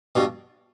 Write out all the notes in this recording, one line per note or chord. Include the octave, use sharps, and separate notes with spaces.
G2 B2